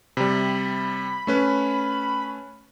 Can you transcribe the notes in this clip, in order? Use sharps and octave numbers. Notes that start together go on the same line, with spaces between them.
C3 G3 B5
A3 C#4 B4